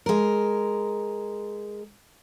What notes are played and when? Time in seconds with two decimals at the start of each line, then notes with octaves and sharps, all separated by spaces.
0.06 G#3 A#4